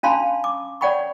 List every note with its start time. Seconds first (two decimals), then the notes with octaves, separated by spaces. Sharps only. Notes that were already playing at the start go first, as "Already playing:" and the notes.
0.03 C#4 D4 F5 A5 B5 C6
0.44 D6
0.81 C#5 D5 F#5 G5 B5 C#6